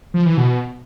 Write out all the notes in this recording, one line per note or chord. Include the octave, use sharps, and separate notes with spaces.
F3
E3
B2